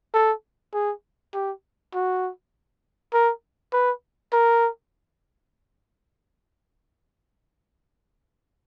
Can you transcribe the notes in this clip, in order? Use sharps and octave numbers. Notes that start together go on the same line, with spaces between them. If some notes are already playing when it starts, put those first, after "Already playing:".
A4
G#4
G4
F#4
A#4
B4
A#4